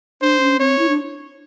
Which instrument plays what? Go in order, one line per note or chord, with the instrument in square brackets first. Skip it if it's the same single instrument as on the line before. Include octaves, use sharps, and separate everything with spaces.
[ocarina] D4 [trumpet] C5
[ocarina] C#4
[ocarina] C4 [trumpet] C#5
[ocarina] E4
D4